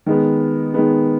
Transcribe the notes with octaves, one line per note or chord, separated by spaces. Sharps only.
D#3 G#3 B3
D#3 G#3 B3